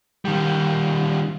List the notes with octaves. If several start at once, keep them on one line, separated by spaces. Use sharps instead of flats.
D#3 G3